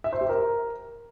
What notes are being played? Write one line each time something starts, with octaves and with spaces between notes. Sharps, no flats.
E5
C5
G4
A#4